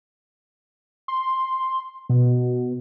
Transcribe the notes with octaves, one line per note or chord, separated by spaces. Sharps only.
C6
B2